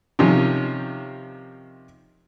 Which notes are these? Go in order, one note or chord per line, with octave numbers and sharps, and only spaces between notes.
C3 D#3 F3 C#4